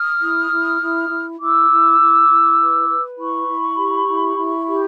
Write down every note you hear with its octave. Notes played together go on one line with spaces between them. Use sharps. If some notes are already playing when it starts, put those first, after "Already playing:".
Already playing: D#6 F6
E4
E4
E4
E4
E4 D6 E6
E4
E4
E4
B4
B4
E4 B5 C#6
E4
G4
E4
E4
G4